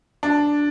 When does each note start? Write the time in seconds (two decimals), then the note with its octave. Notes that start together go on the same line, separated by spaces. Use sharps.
0.23 D4